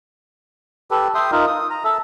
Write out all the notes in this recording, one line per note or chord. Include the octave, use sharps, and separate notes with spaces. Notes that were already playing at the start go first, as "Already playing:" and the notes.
G4 A4 B4
E5 G5 C6 D#6
D#4 F4 A#4
D#6
A#5
A4 E5